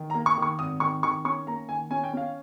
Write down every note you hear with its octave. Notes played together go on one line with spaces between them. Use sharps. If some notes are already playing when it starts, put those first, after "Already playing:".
Already playing: D#3
A#5
A#3
C#6
D#3
C#6
G#1 D#6
D#3 C#6
D#3 C#6
C#4 C#6
A#3 A#5
D#3 G#5
C#4 G#5
G5
C#4 F5